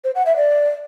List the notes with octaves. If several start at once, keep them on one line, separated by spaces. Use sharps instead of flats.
C5
F#5
E5
D5